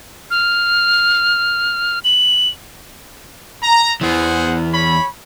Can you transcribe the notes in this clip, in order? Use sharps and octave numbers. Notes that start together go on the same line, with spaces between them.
F6
F#7
A#5
E2 E3 G#4 C5 F#5
C#5 B5